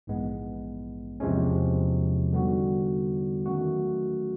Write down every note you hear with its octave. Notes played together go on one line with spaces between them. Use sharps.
A#1 G#2 E3 G#3 B3
E2 C3 F3 G#3 C#4
D3 G3 B3 D#4 F#4
D#3 F#3 A3 C#4 F#4